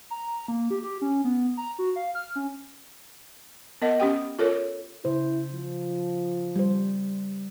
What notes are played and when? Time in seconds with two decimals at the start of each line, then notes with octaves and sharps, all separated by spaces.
0.11 A#5
0.48 A#3
0.70 G4
0.83 G4
1.02 C#4
1.24 B3
1.57 A#5
1.79 F#4
1.96 F5
2.15 F6
2.36 C#4
3.82 B3 A#4 D#5 F#5
4.00 C#4 G4 G5
4.39 F4 A4 A#4 C#5
5.05 C#3 E4 C5
5.54 F3
6.56 G3 C5